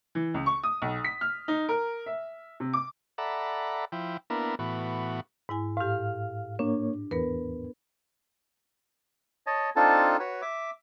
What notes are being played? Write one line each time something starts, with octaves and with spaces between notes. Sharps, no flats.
E3
C#2
C#6
D#6
B1
B6
F6
D#4
A#4
E5
C3
D6
A4 D5 E5 F#5 A#5 B5
F3 E4 G5
A#3 B3 D4 E4 A#4
A2 E3 B3 F#4
G#2 E4 G#5
A2 G4 F5 F6
A#3 D4 C#5
E2 B3 A#4 B4
C#5 D#5 A5
C4 D4 D#4 F4 A4 A5
F#4 B4 C#5
E5 D6